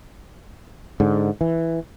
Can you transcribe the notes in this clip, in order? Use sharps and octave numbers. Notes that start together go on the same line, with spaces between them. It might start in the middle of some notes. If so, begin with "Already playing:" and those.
G#2 D3
E3